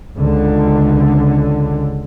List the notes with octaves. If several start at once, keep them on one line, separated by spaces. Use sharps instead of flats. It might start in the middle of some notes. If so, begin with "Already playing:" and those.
C#2 D3